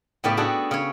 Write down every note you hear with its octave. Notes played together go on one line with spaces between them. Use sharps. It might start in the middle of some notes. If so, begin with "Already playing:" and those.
A2 C#3 B3 G4 D5
D4 F#4 G#4 A4
C#3 C#5